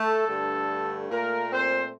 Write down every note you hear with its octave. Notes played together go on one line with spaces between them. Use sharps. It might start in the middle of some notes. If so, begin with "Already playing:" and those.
Already playing: A3 A4
G2 D3 A3
A#2 A3 A#3 A#4
C4 C5